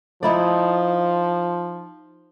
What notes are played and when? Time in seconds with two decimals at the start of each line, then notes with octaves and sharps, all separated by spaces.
0.23 F3 D#4 E4 D5